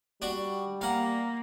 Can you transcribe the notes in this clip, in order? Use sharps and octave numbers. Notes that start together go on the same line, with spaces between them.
G3 D4 F#4
A#3 F5 F#5